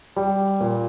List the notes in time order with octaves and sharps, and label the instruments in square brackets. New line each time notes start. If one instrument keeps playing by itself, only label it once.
[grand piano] G3
A#2